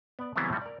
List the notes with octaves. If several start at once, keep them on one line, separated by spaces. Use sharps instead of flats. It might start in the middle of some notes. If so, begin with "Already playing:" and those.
B3 D5
C#3 E3 F#3 G3 B3 C4
A2 F3 G3 F#4
A#4 D5